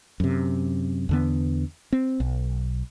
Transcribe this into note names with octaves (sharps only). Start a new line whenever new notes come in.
F#2 C3
E2 D3 B3
C4
B1